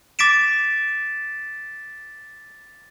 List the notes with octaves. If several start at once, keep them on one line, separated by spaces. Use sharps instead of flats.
D6 A6 B6 D7 E7